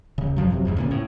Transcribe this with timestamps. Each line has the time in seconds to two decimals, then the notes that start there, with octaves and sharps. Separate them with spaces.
0.18 D#1 C#3
0.36 G#1 G2 F3 F#3
0.50 F2 C3 F#3
0.65 G1 E2 G#2
0.77 D2 A#2 C#3
0.91 A2